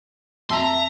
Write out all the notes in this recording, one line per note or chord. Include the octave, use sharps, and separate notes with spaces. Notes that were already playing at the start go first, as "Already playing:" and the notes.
F2 E5 A5 A#5 C6 E6